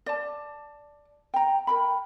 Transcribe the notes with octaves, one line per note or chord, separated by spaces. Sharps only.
D5 A5
G5 A#5
A#4 G5 B5